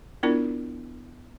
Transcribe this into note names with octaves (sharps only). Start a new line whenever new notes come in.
B3 D4 E4 F4 A#4 D5